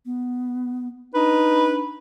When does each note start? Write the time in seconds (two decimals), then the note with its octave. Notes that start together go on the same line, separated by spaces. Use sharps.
0.06 B3
1.14 D4 D#4 B4